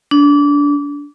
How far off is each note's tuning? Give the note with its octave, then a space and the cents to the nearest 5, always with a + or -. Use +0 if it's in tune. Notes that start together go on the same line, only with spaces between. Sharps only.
D4 -25